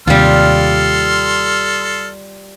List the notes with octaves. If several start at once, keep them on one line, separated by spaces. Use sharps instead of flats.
D#2 C3 G3 F4 A4 C6 F6